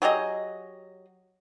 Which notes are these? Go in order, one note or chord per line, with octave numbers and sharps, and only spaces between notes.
F#3 G4 G#4 D#5